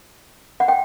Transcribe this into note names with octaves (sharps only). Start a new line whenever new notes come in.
F#5
G5